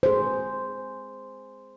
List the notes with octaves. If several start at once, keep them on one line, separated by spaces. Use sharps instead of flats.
G#4 C5